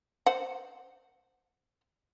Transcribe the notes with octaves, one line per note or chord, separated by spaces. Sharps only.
C5 F#5